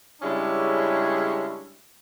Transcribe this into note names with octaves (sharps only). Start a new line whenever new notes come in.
C#3 G3 G#3 C#4 D4 E4